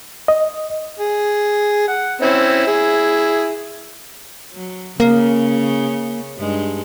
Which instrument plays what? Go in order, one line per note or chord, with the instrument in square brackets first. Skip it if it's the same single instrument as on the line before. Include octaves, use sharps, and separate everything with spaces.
[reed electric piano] D#5
[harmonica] G#4
F#5
C4 C#4 E4
E4 G#4
[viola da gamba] F#3
[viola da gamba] C#3 C#4 [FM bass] A#3
[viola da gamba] G2 G#3 D#4